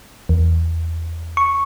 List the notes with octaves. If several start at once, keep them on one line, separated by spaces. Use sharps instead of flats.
E2
C#6